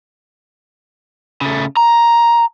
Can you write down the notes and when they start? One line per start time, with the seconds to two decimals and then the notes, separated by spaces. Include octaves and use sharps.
1.41 C#3 A3
1.77 A#5